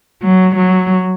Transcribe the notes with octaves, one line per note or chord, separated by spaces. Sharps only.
F#3
F#3